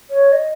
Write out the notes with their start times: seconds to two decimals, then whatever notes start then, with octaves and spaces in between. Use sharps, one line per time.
0.10 C#5
0.32 D#5